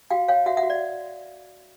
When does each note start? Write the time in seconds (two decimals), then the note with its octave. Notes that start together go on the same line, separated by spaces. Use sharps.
0.11 F#4 F5 G5
0.28 C#5 F5 G5
0.46 F#4 E5 F#5
0.57 E5 F#5
0.63 F#4
0.70 D5